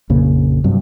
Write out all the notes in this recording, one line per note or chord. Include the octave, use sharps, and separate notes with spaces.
A#1 F2 C#3 A#3
G2 C3 F#3